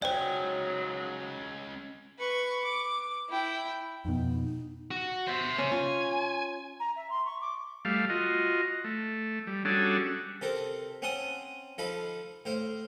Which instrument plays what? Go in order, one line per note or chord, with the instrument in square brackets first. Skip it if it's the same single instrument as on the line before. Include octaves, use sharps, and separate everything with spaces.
[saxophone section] G#2 F#3 [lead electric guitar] G#3 C#4 [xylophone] C5 D5 [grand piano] G5
[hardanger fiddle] B4 C#6
D6
E4 G5
[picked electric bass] F2 B2 [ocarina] D#4
[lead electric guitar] F#4
C5 E5
[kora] C#4
[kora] F4 [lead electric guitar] G#5
[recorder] A#5
E5
C6
C#6
D6
[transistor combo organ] G3 A3 F5
F4 F#4 D#5
A3
G3
G3 C#4 D4 F#4 G#4 A4
[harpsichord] C3 A4 A#4 C5
C4 C#4 F#5 A5 C6 D#6
F3 D#4 A4 F5 B5
A2 C5 F5